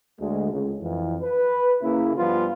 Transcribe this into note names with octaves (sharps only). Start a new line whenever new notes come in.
D2 G#3
C#2
F2 E3
B4
C#3 A#3 E4
G2 F3 G3 B3 D4 F4